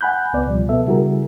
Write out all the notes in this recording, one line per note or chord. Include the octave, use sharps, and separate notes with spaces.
F#5 G#5 B5 F#6 G6
C#2 B3 D5
C#2 B2 F3 G3
B2 B3 A4 E5
C#3 G3 E4 F#4 G#4 A#4